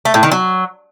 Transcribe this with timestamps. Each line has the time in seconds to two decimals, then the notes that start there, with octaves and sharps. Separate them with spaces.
0.05 A3
0.14 A2
0.23 D#3
0.31 F#3